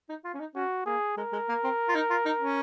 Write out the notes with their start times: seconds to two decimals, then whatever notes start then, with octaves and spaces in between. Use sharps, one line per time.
0.09 D#4
0.24 F4
0.34 C#4
0.40 D#4
0.55 C#4 F#4
0.86 A#3 G#4
1.17 G#3 A#4
1.33 G#3
1.49 A#3
1.64 C4
1.88 F4
1.95 D#4
2.10 F4
2.25 D#4
2.41 C#4